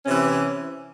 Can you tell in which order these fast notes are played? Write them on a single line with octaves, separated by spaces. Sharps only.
C#4 C3 E3